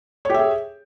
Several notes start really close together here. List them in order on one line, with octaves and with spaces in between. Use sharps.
C#5 G4 E5 G#4